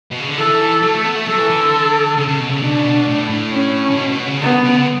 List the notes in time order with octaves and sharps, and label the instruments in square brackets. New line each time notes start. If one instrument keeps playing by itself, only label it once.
[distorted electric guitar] B2
C#3
D3
[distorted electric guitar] E3 [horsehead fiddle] A4
[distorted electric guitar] F#3
A3
B3
A3
[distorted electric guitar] F#3 [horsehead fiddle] A4
[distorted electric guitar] E3
E3
D3
C#3
C#3
B2
C#3
[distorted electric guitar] B2 [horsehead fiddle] D4
[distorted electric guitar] C#3
B2
A2
A2
[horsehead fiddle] C#4
[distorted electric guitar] A2
B2
B2
C#3
[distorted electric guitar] D3 [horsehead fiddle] B3
[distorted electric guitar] C#3
D3